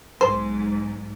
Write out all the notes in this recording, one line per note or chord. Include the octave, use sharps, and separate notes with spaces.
B1 G#2 C5